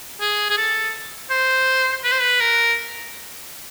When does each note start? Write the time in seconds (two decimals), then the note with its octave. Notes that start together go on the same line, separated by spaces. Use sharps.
0.21 G#4
0.50 G#4
0.57 A4
1.30 C5
2.03 B4
2.12 C5
2.19 B4
2.41 A#4